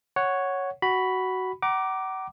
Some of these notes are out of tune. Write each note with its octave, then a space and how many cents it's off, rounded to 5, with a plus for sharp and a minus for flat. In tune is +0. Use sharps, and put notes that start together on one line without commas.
C#5 +0 F#5 +0
F#4 +10 B5 +0
F#5 +40 A#5 +20 D6 +0